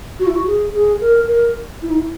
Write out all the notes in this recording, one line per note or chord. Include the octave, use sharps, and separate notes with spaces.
F#4
E4
F#4
G#4
G#4
A#4
A#4
E4
D#4
E4